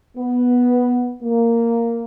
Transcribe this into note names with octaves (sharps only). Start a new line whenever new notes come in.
B3
A#3